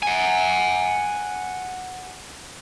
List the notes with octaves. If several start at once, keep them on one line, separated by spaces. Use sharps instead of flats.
F#5 G#5